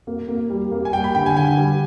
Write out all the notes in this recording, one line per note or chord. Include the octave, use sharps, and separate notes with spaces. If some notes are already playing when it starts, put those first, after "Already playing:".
A#3
A#3
G3
A#3
G#5
G3 G5
B5
D3 G5
G#5
D3 G#5
G3